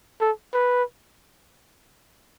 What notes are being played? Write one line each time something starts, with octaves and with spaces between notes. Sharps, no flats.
A4
B4